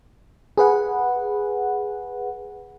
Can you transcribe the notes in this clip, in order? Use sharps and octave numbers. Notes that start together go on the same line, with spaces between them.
G#4 B4 F#5